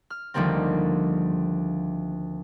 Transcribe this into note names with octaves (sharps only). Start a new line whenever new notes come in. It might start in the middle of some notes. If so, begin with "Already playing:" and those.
F6
D2 D#3 F3 G3 A#3 C4